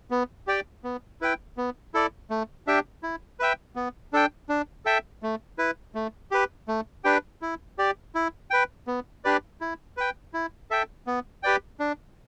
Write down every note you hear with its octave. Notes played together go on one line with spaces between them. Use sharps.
B3
G4 D5 G5
B3
E4 B4 G5
B3
E4 A4 D5
A3
D4 G4 E5 G5
E4
B4 E5 G5
B3
D4 A4 G5
D4
A4 E5 G5
A3
E4 B4
A3
G4 B4
A3
D4 G4 B4 G5
E4
G4 D5
E4
B4 G5
B3
D4 G4 B4 D5
E4
B4 G5
E4
A4 E5 G5
B3
G4 B4 D5 G5
D4